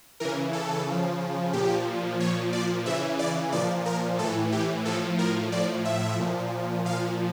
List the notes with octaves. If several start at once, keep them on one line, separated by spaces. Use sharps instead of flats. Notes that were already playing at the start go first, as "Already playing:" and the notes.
C#3 E3 A#4
A4
C#3
F3
A#2 F3 G4
A#2 F3 C#5
D5
C#3 E3 E5
D5
A#2 F3 D5
A#4
A2 E3 A4
G4
A2 F3 A4
A#4
A2 F3 D5
E5
A#2 F3
A#2 F3 F5